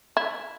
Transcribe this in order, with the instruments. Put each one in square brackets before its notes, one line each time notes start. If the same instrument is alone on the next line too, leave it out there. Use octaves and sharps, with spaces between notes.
[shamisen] E4